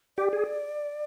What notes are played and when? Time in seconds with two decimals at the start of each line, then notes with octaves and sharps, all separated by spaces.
0.18 G4 D5
0.33 G#4